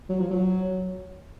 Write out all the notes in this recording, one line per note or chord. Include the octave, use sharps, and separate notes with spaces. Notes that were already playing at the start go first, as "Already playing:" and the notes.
F#3
F3
F#3